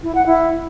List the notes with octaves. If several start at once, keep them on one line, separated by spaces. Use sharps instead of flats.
E4
F#5
E4